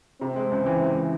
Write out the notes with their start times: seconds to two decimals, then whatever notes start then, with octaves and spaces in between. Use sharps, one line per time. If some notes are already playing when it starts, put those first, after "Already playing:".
0.21 C3 C4
0.36 G#3
0.52 C#2
0.66 E3
0.81 C#2
0.96 E3